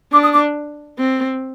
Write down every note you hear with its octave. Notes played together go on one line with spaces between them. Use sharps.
D4 D6
D#6
D6
C4